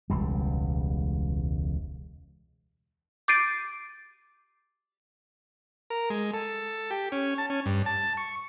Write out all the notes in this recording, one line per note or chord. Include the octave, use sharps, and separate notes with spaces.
E1 C#2 G3
D6 G6 A6 C7 D7 D#7
A#4
G#3
A4
G4
C#4
A5
C#4
G2
A5
C#6